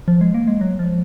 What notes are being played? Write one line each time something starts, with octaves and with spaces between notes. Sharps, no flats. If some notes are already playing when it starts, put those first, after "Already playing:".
F3
G#3
A#3
G#3
F#3
F3